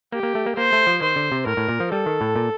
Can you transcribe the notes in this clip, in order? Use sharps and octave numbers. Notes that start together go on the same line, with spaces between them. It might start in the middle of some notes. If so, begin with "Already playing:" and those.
A#3 G4
A#3
A3
A#3
A#3 C5
A3
F3
D#3 C5
D3
C3
A2 A#4
A2
A#2
F3
G3 A4
D#3
A2
A#2